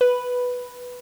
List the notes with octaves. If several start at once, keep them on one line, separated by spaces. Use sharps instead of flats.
B4